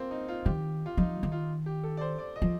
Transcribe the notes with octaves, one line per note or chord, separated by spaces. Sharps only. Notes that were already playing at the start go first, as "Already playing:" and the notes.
Already playing: A#3 C4 F4
D#4
F4
D#3 G4
F4
F3 D#4
D#3
F4
G4
A4
D5
C5
D5
D#5
F3